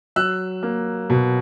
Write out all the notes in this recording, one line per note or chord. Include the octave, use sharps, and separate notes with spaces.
F#3 E6 F#6
A#3
B2